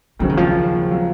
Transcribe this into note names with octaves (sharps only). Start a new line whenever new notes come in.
D#2 C#3 F3 F#3 C4
D#3
F3
F#3 C4